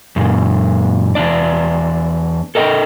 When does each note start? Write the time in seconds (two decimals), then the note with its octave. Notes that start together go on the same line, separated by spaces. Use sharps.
0.16 F#2 A#2
1.15 E2 G#2 D4 D5
2.55 A4 A#4 D#5 G5